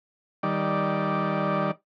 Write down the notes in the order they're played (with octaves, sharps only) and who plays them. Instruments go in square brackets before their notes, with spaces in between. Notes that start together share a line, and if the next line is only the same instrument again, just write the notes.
[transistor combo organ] D#3 G3 D5